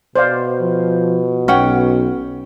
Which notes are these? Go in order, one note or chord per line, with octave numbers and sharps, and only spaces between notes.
B2 C5 D5 F5
F3
B1 C#4 F#5 G5